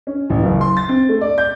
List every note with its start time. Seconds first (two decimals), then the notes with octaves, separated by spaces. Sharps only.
0.07 C#4
0.30 A1
0.43 F#1
0.61 C6
0.77 A6
0.89 C4
1.09 A3
1.21 D5
1.38 G6